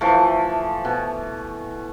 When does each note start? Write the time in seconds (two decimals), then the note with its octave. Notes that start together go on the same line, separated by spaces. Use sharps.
0.01 E3 F3 A3
0.85 B2